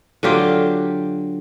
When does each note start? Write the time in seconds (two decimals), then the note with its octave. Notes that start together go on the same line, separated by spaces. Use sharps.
0.23 D3 F#3 F4 G4